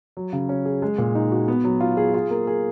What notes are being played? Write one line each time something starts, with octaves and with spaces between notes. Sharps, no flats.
F#3
C#3
C#4
G#4
G#3
A#2
D#4
F#4
B3
F#3
F4
G#4
F4
A#3
G#4